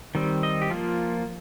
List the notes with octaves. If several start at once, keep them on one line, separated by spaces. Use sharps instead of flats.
D#3 G3 C4
D#5
G4
F3 A#3 F4